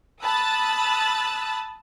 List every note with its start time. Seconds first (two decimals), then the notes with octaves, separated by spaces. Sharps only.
0.23 A5 B5 D#6 E6 F#6 A6